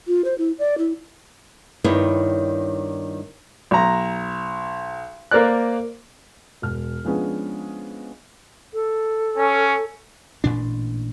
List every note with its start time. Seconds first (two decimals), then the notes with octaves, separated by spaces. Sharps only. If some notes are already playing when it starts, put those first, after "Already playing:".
0.08 F4
0.24 C5
0.38 E4
0.59 D5
0.78 E4
1.84 G2 D#3 B3 E4 C#5
3.71 B1 A#5
5.31 A#3 A#4 C5 D5 F#6
6.62 E1 F6
7.05 F3 G#3 B3 C#4 D4
8.74 A4
9.36 C#4
10.44 A1 A#2 D4